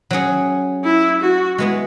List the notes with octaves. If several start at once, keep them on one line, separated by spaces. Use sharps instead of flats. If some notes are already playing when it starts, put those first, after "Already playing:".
F#3 C#4 G#4
E4
F#4
G#3 B3 E4 G#4